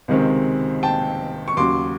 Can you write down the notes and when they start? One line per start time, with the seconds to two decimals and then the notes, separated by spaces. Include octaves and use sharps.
0.08 C#2 C3 D#3 G#3 C4
0.83 G5 A5
1.48 C#6
1.57 D#2 C#3 F#3 C6 D6